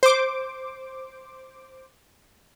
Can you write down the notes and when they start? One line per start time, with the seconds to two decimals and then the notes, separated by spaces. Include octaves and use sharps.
0.03 C5 D6